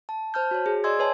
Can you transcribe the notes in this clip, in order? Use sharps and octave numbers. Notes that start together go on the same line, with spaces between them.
A5
C5 A5 F6 G6
F#4 C#5
G#4
D5 D#5 G#5 C6 E6 G#6
B4 C#5 G#5 A5 C6